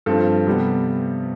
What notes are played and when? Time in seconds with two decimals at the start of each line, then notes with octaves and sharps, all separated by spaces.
0.06 G2 F3 C4 A4
0.47 C3 G3 B3